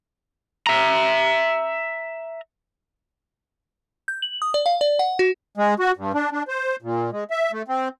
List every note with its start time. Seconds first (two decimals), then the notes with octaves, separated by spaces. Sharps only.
0.67 E5 A#5
4.08 G6
4.22 F#7
4.42 D#6
4.54 D5
4.66 F5
4.81 D5
4.99 F#5
5.19 F#4
5.57 G#3
5.79 F#4
5.97 G2
6.14 D4
6.32 D4
6.48 C5
6.82 A#2
7.12 G#3
7.30 E5
7.52 A3
7.68 C4